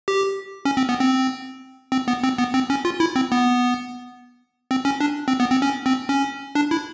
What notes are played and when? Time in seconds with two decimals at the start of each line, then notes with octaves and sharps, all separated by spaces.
0.08 G4
0.65 C#4
0.77 C4
0.89 B3
0.99 C4
1.92 C4
2.08 B3
2.23 C4
2.38 B3
2.54 C4
2.70 C#4
2.85 F4
3.00 E4
3.16 C4
3.32 B3
4.71 C4
4.85 C#4
5.01 D4
5.28 C4
5.40 B3
5.52 C4
5.62 C#4
5.86 C4
6.09 C#4
6.55 D4
6.71 E4